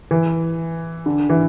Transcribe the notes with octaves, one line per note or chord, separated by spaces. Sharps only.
E3
D3
E3